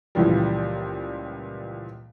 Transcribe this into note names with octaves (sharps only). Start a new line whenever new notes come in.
C#2 A#2 E3 F3 G3